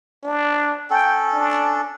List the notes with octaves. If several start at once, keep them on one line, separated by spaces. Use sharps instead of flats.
D4
C#4 A4 G5
D4